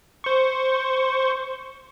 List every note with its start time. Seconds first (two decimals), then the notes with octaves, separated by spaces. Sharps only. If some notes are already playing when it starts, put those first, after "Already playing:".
0.24 C5 C#6